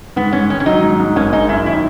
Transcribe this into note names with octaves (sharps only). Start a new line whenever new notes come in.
G#2 B3
G#2 C#4
D#3 C#4
C#4
F#3 D#4
G#2
G#2
G#1 C#4
G#3 D#4
F#2 E4
D#3 E4